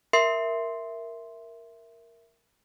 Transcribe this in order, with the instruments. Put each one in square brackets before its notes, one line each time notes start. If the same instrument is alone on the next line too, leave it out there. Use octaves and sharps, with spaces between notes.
[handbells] A#4 E5 C6 C7